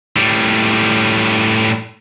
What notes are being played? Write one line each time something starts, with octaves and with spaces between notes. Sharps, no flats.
A2 G3